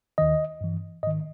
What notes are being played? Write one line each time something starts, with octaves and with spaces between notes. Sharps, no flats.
D#2 D#3 D#5
G2 E3
G#2 D#3 D#5